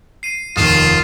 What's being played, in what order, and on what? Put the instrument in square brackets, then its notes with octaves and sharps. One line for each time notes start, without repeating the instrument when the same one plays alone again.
[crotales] C7 D#7
[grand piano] F1 D#2 [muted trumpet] F4 [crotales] D#6 E7